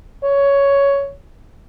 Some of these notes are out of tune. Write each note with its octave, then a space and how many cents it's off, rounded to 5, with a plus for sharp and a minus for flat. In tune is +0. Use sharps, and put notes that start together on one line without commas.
C#5 +10